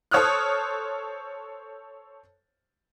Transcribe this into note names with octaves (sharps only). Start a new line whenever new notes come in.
A4 C5 C#5 D#6 F6 F#6